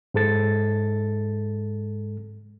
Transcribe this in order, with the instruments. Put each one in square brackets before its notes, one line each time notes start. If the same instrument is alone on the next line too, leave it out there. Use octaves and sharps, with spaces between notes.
[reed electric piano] G#2 G#3 A4 A6